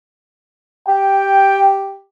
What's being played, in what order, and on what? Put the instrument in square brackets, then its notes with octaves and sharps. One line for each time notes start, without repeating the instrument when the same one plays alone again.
[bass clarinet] G4 [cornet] G5